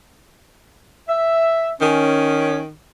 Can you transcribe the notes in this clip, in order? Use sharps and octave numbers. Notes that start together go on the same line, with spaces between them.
E5
D#3 C#4